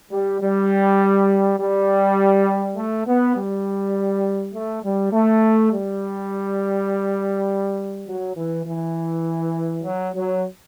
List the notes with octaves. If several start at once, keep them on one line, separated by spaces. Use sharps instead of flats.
G3
G3
G3
A3
B3
G3
A3
G3
A3
G3
F#3
E3
E3
F#3
F#3